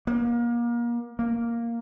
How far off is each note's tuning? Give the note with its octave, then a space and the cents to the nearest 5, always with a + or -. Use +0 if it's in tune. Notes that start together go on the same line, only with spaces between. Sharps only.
A#3 +30
A#3 +0